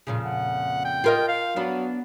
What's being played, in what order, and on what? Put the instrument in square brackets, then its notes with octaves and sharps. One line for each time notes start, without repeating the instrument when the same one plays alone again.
[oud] F2 A#2 C#3
[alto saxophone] F#5
G5
[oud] F4 A#4 D#5
[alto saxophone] F5
[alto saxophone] F#3 [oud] B3 D4